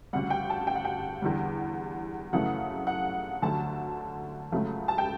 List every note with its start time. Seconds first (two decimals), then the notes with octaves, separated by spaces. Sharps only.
0.13 D2 C#3 G3 F#5
0.30 G5
0.50 A5
0.67 G5
0.75 F#5
0.85 G5
1.22 E2 D3 G3
2.33 F#2 C#3 E3 A3 F#5
2.87 F#5
3.42 D2 D3 F#3 A3 A5
4.52 C#2 C#3 F#3 A3
4.88 A5
4.98 G5